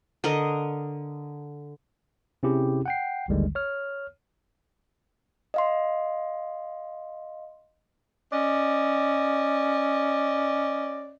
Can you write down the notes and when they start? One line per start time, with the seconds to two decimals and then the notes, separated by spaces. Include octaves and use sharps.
0.24 D3 A#4 D#5
2.43 C3 C4 C#4 E4 G4 G#4
2.86 F#5 G5 C7
3.28 A1 D#2 D3 D#3 G3 G#3
3.55 C#5 F6
5.54 D#5 F5 C6
8.33 C#4 D5 D#5